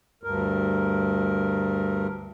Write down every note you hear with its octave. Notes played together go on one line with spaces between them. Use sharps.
D2 G2 A#4